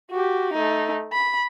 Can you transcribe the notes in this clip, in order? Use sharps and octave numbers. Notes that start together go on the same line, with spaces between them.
F#4 G4
A3 D#4
B5